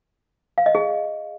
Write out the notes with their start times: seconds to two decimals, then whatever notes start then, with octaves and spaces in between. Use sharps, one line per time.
0.58 F5
0.66 D#5
0.75 G#4